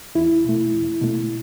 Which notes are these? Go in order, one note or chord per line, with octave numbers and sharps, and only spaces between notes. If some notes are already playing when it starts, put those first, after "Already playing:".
E2 E4
B2 A3
E2
B2 A3